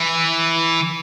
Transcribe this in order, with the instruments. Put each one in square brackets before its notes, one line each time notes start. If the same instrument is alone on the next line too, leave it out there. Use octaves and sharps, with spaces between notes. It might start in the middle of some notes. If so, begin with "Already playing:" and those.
Already playing: [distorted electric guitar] E3